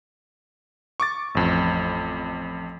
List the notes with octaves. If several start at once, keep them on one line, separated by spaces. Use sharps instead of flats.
C#6 D6 A6
A1 F2